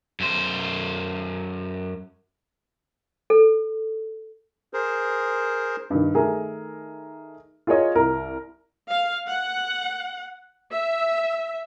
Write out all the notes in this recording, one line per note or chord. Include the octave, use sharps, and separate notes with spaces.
F#2 C5
A4
G#4 A#4 C5
G2 D#3
D#3 A3 G#4 A#4
F4 G#4 A#4 C#5 D#5
C2 A#4
F5
F#5
E5